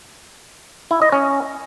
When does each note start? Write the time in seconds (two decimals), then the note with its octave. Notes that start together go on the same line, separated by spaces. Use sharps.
0.91 E4
1.02 D#5
1.12 C#4